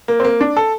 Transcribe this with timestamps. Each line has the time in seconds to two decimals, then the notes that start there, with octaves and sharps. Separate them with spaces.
0.08 A#3
0.20 C4
0.24 A#3
0.41 D4
0.57 A4